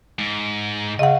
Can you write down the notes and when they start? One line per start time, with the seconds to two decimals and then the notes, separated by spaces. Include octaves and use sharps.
0.19 G#2
0.99 C#3 D#5 F#5